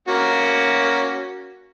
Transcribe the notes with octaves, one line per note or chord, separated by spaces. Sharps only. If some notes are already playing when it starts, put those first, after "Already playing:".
A#3 C#4 F#4